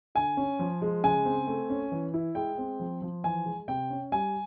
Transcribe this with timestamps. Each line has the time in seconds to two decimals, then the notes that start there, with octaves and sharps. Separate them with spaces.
0.15 D3 G#5
0.37 C#4
0.59 F3
0.82 G#3
1.03 C#3 G#5
1.25 C4
1.47 A3
1.70 C#4
1.92 E3
2.14 E4
2.35 G#3 G5
2.58 C4
2.80 F3
3.02 F3
3.24 E3 G#5
3.45 G#3
3.68 C3 G5
3.90 C#4
4.12 G3 G#5